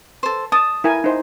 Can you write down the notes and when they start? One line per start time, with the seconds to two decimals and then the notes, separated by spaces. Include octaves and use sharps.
0.23 A4 C5
0.52 A5 D#6
0.84 E4 A#4 G#5
1.04 D#4 C5